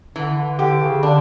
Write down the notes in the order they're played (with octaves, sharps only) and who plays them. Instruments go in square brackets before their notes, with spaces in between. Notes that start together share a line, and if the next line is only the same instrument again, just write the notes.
[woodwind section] D3 [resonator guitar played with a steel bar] E3
[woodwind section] D3
[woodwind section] D3 [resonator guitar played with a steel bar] G4
[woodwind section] C#3
[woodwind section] D3 [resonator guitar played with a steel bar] D4